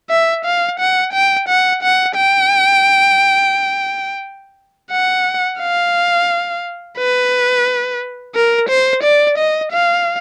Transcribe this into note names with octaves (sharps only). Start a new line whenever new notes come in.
E5
F5
F#5
G5
F#5
F#5
G5
F#5
F5
B4
A#4
C5
D5
D#5
F5